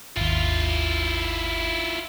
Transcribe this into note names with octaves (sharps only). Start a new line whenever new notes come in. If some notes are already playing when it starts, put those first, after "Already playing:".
G#1 D#2 E4 F4